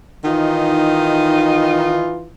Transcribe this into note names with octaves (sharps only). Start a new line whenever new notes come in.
D#3 E3 D#4 F4